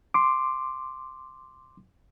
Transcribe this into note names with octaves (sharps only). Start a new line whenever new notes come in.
C6 D6